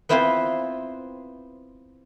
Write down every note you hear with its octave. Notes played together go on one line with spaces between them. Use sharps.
B3 C4 E4 F4 B4 C5